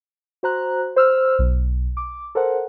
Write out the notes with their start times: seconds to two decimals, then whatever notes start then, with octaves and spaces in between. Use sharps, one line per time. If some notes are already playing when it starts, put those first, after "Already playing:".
0.43 F#4 C5 A#5 F#6
0.96 C5 E6 F6
1.39 B1
1.97 D6
2.35 A4 A#4 C5 F#5